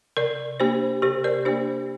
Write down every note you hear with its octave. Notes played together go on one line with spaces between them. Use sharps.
C3 A#4 D5
A#3 D4 G4 C5
C3 G4 C5
A#4 D5
A#3 D4 G4 C5